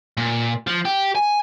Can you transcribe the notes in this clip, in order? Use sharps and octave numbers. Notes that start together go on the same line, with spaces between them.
A#2
F3
G4
G#5